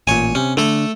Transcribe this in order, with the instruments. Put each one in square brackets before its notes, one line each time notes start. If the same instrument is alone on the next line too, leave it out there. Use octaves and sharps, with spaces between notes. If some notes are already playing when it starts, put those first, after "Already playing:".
[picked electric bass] A1 A#2 [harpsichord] C#5 G#5
[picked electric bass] C3 [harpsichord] C#4
[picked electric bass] D3 [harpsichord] A3 A4